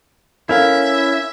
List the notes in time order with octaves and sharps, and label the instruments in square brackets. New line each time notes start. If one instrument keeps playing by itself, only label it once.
[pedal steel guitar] C#4 E4 [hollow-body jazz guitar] A4 A#4 F5 [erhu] E5